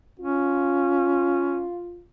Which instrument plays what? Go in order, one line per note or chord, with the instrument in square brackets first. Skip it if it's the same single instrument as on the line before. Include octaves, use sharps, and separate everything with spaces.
[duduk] C#4 [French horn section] F4